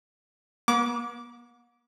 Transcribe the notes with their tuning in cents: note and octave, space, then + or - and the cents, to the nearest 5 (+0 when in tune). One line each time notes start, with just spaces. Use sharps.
B3 -45 D6 -15